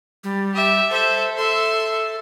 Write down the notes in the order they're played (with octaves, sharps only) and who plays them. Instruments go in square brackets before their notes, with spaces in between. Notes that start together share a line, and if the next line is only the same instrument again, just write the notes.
[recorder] G3
[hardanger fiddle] G4 E5
[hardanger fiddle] A4 E5 [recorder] C5
[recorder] A4 [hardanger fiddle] E5 C6